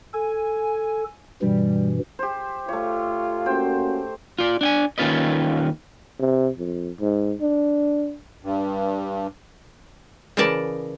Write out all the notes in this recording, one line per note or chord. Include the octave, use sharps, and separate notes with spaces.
A4 G#5
G2 B2 E3 G3
G4 C5
A3 F4 C#5
A#3 C#4 F#4 C5 G5
F4 D5
D4 G5 G#5
D#2 D#3 C#4 F4 B4 D#5
C3
F2
G#2
D4
G2
C#3 E3 A#4 D5 A5